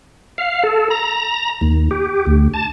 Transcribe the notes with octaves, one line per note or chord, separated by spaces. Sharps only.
F5
A4
A#5
D#2
G4
D2
A5